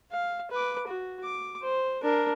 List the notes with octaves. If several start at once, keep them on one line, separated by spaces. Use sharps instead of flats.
F5
B4 D6
F#4
D6
C5
D4 A#4